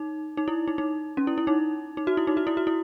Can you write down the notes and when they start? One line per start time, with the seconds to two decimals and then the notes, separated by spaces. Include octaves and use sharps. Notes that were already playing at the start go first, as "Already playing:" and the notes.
Already playing: D#4
0.37 D#4
0.48 E4
0.68 D#4
0.78 D#4
1.17 C#4
1.27 E4
1.38 E4
1.47 D#4
1.97 D#4
2.07 F#4
2.17 E4
2.27 D#4
2.37 F#4
2.47 E4
2.57 F#4
2.67 E4